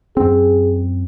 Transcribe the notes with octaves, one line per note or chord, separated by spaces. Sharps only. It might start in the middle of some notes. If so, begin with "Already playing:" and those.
F#2 C4 G#4